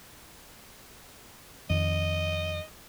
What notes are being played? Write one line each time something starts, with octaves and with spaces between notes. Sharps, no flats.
F2 D#3 D#5